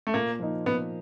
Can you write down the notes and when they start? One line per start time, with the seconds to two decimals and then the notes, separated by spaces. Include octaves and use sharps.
0.07 A3
0.14 A#2 A#3
0.39 F3 A#3 D#4
0.66 A#2 B3